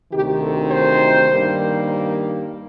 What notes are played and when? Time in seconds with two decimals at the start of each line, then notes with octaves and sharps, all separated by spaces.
0.12 D2 C3 D#3 G4
0.41 A4
0.71 C5
1.30 G2 D#3 G3 A#3